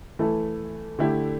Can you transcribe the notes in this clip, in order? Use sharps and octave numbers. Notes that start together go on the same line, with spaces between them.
E3 A3 E4 A4
D3 A3 E4 G4